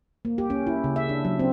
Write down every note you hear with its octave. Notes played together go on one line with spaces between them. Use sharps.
A#3
G4
C#4
E4
C#3
E5
D4
F#3
C4